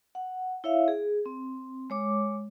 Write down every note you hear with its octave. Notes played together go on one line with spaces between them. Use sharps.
F#5
E4 C#5 E5 F5
G#4
C4
G#3 C#5 D6